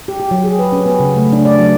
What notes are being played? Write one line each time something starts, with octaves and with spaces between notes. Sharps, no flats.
G4
G4
F#3
G#4
B4
C#4
B3
C#3
A3
D4
D5
F#3